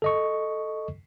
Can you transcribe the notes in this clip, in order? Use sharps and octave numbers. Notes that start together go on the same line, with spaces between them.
A4 D#5 C#6